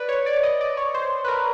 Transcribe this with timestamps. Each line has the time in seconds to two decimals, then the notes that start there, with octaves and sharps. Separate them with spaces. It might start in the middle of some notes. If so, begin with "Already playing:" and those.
Already playing: B4 D5
0.09 C#5
0.26 D5
0.43 D#5
0.61 D5
0.77 C#5
0.94 C5
1.25 B4
1.28 A#4